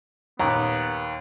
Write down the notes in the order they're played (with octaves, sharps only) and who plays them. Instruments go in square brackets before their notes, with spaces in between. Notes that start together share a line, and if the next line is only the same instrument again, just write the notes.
[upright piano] D#2 [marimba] A#2 E6 [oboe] B3 [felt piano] A#5